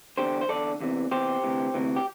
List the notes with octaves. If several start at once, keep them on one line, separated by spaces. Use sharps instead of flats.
E2 D3 G4 C5
C5
E2 D3 A4 D5
E2 C3 E3
E2 C3 E3 G4 C5
D2 C3 E3
D2 C3 E3
G4